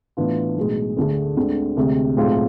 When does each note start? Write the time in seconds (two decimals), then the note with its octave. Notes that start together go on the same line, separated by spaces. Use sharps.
0.17 A2 E3 B3 D4 F4
0.57 B1 A2 G#3
0.97 D2 D3 A3 D4 G#4
1.37 D2 D3 G#3 C4
1.77 D2 C3 G#3
2.17 B1 A2 G#3 C4 F4